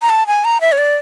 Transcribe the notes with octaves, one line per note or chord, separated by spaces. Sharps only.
A#5
A5
G#5
A#5
E5
C#5
D5